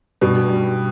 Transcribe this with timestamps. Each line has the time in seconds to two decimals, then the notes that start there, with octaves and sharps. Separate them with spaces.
0.21 G2 B2
0.48 G3